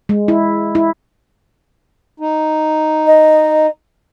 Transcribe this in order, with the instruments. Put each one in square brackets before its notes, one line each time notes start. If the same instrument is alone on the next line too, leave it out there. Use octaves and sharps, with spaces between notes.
[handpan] G#3
E4
E4
[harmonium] D#4
[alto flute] D#5